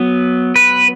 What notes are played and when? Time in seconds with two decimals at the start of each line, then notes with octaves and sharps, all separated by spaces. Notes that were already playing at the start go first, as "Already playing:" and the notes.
Already playing: F#3 B3
0.56 B4